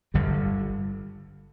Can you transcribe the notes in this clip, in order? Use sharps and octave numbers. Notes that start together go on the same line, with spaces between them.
G1 G2 D3 G3